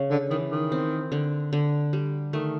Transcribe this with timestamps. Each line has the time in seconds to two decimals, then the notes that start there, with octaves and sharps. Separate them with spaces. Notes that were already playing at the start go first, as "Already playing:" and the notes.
Already playing: C#3 C#4
0.11 D3
0.30 D#3 E3
0.51 D#3
0.72 C4
1.12 D3
1.53 D3
1.93 G3
2.33 D#3 A3